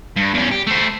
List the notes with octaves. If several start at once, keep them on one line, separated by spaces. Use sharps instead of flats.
G2
E2 C#4
G4
A3 C5